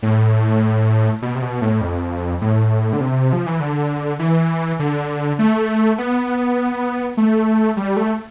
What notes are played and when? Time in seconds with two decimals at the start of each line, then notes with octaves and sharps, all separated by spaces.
0.02 A2
1.22 B2
1.35 C3
1.42 B2
1.61 A2
1.81 F2
2.41 A2
2.93 D3
3.00 C3
3.33 F3
3.46 E3
3.60 D3
4.19 E3
4.79 D3
5.39 A3
5.98 B3
7.17 A3
7.77 G3
7.96 A3